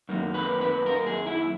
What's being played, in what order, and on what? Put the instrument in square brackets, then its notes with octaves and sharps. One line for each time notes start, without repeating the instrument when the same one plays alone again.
[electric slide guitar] F#2 D#3 A#3
B4
B4
A#4
G#4
E4